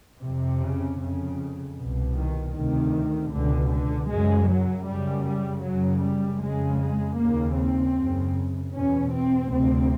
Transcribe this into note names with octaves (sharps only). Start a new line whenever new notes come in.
F2 C3
C#3
F2 C#3
C2 B2
D#3
D2 C3 D#3
C#2 B2 D3
D3
F#2 C#3 G#3
F#3
F#2 C#3 G3
G3
F#2 C#3 F#3
G3
F2 C#3 G#3
G#3
D#2 C#3 A#3
C4
F#2 C#3
E2 B2 C#4
C4
D2 C3 C4